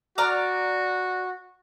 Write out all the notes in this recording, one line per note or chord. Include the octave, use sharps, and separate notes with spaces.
F#4 D5 A#5 F6